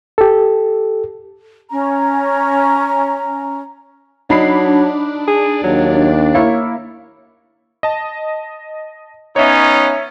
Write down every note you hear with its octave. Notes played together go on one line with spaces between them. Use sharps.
G4 A4
C#4 A#5
F#3 D4 D#4 B5 C7
G#4
D#2 F#3
A#3 E4 C#5
D#5 A5
B3 C#4 D#4 C#5 E5